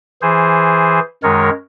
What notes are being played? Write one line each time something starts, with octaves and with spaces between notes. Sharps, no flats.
E3 G#4 C5
F#2 D#3 G#3 A#4 C#5